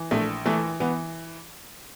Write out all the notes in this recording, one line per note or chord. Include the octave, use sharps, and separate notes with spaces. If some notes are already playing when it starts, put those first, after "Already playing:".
Already playing: E3
A#1 A3
E3 A3
E3 B3